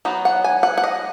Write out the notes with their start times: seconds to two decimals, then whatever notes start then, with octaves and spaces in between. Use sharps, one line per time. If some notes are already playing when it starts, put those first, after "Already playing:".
0.05 F#3 B3 D#4
0.25 F#5
0.44 G#5
0.63 F#5
0.78 F#5
0.84 D#5